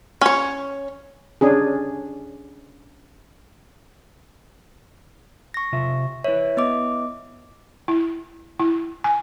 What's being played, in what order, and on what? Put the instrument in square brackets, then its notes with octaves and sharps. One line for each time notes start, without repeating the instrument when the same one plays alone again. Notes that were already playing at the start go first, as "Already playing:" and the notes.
[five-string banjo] C#4 C#5
[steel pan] C#4 D4 G#4
[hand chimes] C#6 A#6
[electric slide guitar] C3 F4 E5
[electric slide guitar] E4 B4 E5 [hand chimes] C#5
[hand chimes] B3 D#5 D6
[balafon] E4
E4
G#5